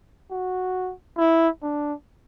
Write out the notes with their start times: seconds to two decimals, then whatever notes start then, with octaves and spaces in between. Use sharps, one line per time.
0.31 F#4
1.18 E4
1.62 D4